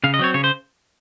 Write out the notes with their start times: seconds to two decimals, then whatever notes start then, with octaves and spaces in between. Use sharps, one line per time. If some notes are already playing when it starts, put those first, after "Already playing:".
0.04 C#3 F5
0.14 D#5
0.19 F#3 C4 C#5
0.34 C#3 C#5
0.44 C5